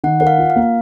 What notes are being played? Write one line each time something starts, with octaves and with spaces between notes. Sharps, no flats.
D#3 F#5
A#4 F#5
F5
F4
F5
A#3